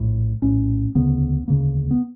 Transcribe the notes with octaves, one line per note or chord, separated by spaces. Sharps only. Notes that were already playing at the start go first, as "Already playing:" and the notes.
Already playing: A#1 A2
A#1 A2 C#4
E1 D2 C#3 B3
E1 D2 C#3 A#3
B3